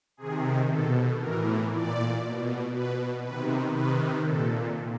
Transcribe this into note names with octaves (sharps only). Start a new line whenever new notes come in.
C3 D#3 G#4
B2 A4
A2 E3 A#4
A#2 D5
B2
B2 B4
C3 D#3 B4
C3 D#3 B4
A#2 A4